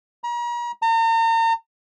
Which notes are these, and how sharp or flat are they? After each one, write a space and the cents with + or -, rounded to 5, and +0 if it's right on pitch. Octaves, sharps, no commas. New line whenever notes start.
A#5 +40
A#5 -40